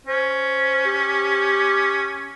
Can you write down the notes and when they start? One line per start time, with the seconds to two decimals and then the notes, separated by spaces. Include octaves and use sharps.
0.07 C#4 C5
0.86 G4